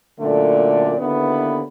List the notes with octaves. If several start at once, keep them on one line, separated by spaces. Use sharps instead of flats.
F#2 A#2 D3 A3 D5
D#2 D3 B3 E4 B4